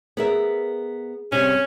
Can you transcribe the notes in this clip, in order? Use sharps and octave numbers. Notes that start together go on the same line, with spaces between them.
B3 G#4 A#4 E5
C3 G3 C#4